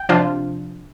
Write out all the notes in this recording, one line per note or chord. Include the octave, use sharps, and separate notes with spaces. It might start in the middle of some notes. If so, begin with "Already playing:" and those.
Already playing: G5
C3 F3 D4 F4